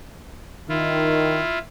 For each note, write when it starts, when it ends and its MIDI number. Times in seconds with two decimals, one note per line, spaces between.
0.69 1.41 51
0.69 1.59 64
0.69 1.59 65